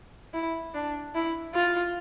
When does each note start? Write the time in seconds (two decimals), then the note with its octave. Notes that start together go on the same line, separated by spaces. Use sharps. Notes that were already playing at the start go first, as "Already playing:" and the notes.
0.33 E4
0.74 D4
1.15 E4
1.54 F4